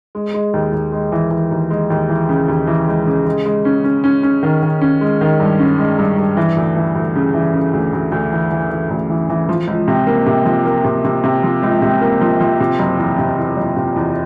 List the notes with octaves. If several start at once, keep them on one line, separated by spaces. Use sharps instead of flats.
G#3
G#3
D#2
D#2
G#3
E3
E3
D#2
G#3
D#2
E3
C#3
D#2
E3
G#3
C#3
G#3
G#3
C#4
C#4
C#4
C#4
D#3
D#3
C#4
G#3
D#3
G2
C#4
G#3
G2
G2
E3
D2
E3
D2
C#3
E3
C#3
D2
D2
D2
E3
E3
E3
D2
E3
E3
F3
C#2
C3
A#3
C3
F3
A#3
C3
C3
C3
F3
C#2
C3
A#3
F3
F3
C3
F#1
E2
C3
E2
F#1
C3
E2